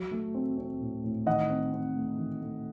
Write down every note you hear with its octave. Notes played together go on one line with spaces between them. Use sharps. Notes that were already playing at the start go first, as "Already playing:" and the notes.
Already playing: F#3
A3
C4
C4
A2
A2
D#3 D#5 F#5
C4
C4
A3
D#3
A3